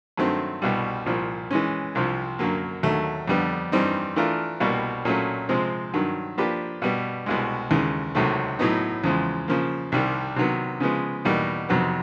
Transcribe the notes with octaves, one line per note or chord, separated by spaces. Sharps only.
G2 D#3 F#3 A3 C4
C2 B2 G3
C2 A#2 F3
E3 G#3 C#4
C2 C3 F3
F#2 D3 F#3 A#3
D#2 D3 F#3 A3
F2 D3 G3 B3
G2 E3 G3 C4 D#4
E3 A3 D4 F4 A#4
C2 B2 G3 A#3
A#2 F#3 A3 C#4
C3 F3 G#3 C4
G2 D#3 F#3
F3 A#3 D4 G4 B4
B2 G3 B3
C2 B2 G#3
D#2 C#3 E3 G#3
C#2 C3 D#3 F#3 A3
A2 F#3 B3 D#4
E2 C#3 F3 G#3
C#3 F3 A#3
C2 C3 D#3 G3
C3 D#3 F#3 B3
C#3 F3 G#3 B3
E2 B2 G3 A#3 D#4
F2 C3 D#3 F#3 B3